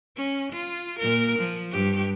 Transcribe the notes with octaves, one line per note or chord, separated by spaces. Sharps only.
C#4
F4
A#2 A#4
F3
G2 G4